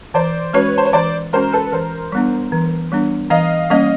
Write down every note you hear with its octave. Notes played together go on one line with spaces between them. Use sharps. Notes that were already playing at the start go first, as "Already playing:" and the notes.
E3 C5 D5
G#3 C#4 F#4 B4 C#5
C5
C#5
E3 C5 D5
G#3 C#4 F#4 A#4 C5
A4 B4
E3 A#4 C5
G3 B3 D4
E3
G3 B3 D4
E3 D#5 F5
G3 A#3 C#4 D#5 F5